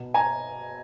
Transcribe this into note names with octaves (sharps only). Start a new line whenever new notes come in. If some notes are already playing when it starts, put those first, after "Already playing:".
Already playing: B2
G#5 A#5